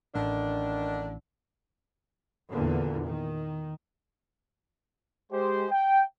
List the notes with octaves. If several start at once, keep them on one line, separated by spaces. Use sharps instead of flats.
A1 D3 D#3 D4
E2 A#2 D3
D#3
G#3 G4 C5
G5